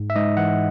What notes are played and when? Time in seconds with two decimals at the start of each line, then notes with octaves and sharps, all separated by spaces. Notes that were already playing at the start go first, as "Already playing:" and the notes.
Already playing: G#2
0.10 E5
0.15 G#2 D#5
0.37 E3 F#5